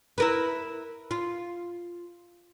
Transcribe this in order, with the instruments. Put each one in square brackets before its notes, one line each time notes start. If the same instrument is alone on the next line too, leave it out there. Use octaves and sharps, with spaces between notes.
[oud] E4 A#4 B4
F4